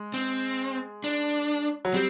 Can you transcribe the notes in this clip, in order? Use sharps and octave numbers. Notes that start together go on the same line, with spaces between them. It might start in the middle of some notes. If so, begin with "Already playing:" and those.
Already playing: G#3
C4
D4
F#3
G3 C4